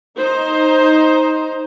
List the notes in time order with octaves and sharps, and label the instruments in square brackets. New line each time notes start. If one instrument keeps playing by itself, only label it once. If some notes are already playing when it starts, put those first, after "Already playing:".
[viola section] D#4 C5